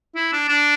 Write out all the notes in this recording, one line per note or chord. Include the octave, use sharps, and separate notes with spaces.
E4
D4
D4